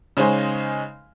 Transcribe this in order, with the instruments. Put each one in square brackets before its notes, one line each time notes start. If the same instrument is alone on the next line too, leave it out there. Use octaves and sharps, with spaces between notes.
[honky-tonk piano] C#3 G#3 D#4 C5 C#5 G#5